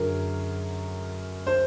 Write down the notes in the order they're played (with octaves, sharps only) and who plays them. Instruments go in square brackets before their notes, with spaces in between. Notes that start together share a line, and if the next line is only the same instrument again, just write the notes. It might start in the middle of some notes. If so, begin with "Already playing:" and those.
Already playing: [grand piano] F#2 D3 F#3 G#4 A#4
C5